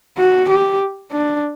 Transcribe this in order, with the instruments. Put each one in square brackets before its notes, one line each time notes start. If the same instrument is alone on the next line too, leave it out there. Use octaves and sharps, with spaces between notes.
[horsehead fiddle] F#4
G4
D4